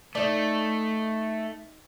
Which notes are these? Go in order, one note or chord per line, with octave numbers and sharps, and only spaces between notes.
A3 D#4 D5